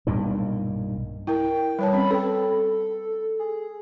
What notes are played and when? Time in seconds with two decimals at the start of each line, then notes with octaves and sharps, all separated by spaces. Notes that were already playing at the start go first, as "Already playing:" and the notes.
0.07 B1 G2 A#2 D#3
1.27 E4 A#4 G5
1.79 G3 B4 C#5 A5
1.93 C4 C#4 B5
2.11 A4 B4 G5
3.39 G#4